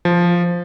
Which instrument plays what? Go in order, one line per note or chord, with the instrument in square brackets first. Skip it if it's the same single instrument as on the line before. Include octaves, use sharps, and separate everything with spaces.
[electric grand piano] F3